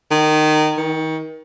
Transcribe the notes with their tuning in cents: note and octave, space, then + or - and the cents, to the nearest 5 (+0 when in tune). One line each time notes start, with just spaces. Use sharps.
D#3 -20
D#3 +30